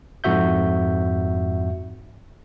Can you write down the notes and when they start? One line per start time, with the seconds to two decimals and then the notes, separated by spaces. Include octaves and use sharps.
0.24 F2 G#2 F#4 E5 G6